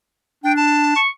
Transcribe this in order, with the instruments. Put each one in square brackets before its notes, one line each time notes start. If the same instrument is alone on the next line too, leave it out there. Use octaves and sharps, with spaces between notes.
[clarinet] D4 [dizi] G5
[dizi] A5
[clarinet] C#6